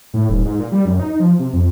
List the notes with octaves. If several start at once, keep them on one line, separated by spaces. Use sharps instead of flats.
A2
D#1
G#2
A#2
G3
F#2
D#4
F3
C3
F2